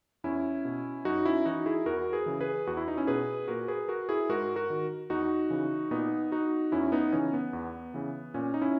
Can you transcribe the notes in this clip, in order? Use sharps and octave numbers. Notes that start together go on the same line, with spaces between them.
E2 C#4 E4
B2
F#2 D#4 F#4
C#4 E4
E3 D#4 F#4
E4 G#4
E2 F#4 A#4
G#4 B4
C#3 E3
G#4 B4
E2 F#4
E4
D#4
C#4 E4
B2 G#4 B4
A#2 F#4 A#4
G#4 B4
F#4 A#4
E4 G#4
G#2 F#4 A#4
F#4 A#4
D#3
E2 D#4 F#4
C#3 E3
A#2 B3 D#4
D#4 F#4
E2 C#4 E4
B3 D#4
C#3 E3 C#4
B3
E2
C#3 E3
A#2 C#4
D#4
C#4 E4